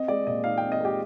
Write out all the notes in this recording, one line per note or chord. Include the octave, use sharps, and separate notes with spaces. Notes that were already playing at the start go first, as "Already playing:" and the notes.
Already playing: C4 D#5
G#3 D5
A#2 D#5
D#4 F5
G5
C4
D#5
G#3 G4